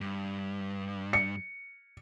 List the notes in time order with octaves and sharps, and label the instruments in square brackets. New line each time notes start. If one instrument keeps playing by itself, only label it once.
[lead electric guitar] G2
[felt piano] C#7